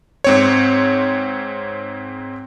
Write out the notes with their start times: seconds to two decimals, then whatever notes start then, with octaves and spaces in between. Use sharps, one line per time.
0.24 G#2 C4 C#5